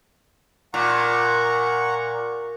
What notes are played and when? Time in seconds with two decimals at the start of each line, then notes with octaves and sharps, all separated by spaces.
0.74 A#2 F#5 A#5 C#6